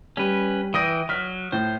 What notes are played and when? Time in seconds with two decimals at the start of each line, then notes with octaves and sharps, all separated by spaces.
0.17 G3 C#4 B4
0.74 E3 G5 D#6 A#6 D#7
1.09 F#3 F6 B6
1.52 A2 C5